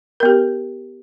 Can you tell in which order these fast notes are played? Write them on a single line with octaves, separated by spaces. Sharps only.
A#4 B3 G4